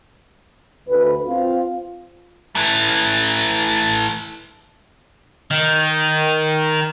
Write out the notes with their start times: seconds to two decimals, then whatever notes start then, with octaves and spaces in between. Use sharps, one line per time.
0.88 D2 B4
1.27 C4 F4
2.55 E3 A3
5.51 D#3